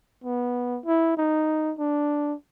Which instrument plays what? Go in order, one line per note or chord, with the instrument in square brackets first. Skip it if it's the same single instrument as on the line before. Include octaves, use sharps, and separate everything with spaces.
[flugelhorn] B3
E4
D#4
D4